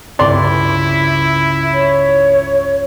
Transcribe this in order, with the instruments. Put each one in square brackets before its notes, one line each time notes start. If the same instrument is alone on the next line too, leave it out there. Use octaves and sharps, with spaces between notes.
[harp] C#2 G2 [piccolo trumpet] E4 [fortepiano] D5 C6
[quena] C#5